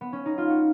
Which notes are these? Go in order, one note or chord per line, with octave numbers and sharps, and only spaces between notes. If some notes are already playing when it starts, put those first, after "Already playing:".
B3
C#4
D#4
F4
F#4